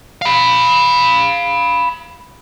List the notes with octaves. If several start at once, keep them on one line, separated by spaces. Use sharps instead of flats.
F5 B5